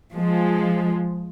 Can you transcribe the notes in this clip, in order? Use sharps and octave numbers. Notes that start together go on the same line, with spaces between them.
F3 G#3